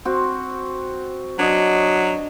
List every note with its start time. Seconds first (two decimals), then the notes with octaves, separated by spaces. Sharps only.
0.05 C4 F#4
1.38 F#3 D4 C#5 D#5